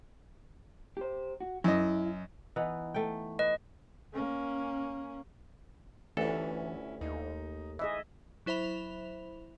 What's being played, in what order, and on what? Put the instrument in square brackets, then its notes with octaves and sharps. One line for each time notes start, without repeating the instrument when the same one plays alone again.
[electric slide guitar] G4 C5
F#4
[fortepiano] F#2 D#5 [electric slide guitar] E4
[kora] E3 B3 D#4
A3 G5
[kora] B4 [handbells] D#5
[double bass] A#3 C#4
[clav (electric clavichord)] G1 D2 A4 [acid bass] E3 [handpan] A3 [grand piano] C#4 E4
[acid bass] D#2 [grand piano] D#4
[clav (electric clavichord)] E3 [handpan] G#4 D#5 E5
[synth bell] F#3 E4 C5 E5 B5 F7